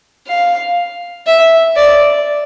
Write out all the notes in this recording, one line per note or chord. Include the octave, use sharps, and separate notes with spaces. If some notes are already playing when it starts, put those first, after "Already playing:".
F5
E5
D5